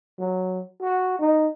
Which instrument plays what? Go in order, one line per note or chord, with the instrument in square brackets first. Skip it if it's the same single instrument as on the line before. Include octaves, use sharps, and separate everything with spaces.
[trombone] F#3
F#4
D#4